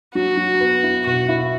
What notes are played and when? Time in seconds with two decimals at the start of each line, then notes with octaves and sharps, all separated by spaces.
0.15 F#3 F#4
0.37 F#3
0.60 B3
0.83 E4
1.06 B2 F#4
1.29 E4